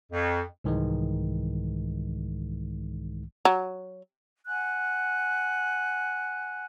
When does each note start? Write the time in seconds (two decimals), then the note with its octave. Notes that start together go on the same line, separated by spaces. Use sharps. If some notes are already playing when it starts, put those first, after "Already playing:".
0.12 F2
0.64 C2 G#2 D#3 E3 G#3
3.45 F#3
4.47 F#5 G#5 F#6